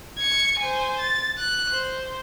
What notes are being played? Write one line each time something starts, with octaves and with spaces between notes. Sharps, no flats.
G#6 C#7
C5 G#5
A6
F#6
C5